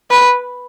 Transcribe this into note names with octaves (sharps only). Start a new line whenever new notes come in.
B4